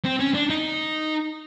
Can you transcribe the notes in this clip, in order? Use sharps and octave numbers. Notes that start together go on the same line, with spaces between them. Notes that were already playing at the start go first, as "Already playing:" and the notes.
C4
C#4
D4
D#4